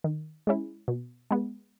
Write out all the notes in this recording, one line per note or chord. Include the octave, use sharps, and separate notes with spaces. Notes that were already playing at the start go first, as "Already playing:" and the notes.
D#3
G#3 C#4 E4
B2
G#3 B3